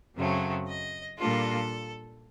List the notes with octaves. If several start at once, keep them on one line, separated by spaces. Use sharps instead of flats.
F#2 C#3 F#3 A3 C4
D#5
A#2 G3 A#3 D4 F4 A4